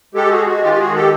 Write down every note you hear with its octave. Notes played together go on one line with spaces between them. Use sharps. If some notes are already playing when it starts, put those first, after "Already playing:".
G#3 G4 A4
F#4 G#4
G#3
F#4
D#3 F4 G4
G4
F#4 G#4
D#3
G4 A4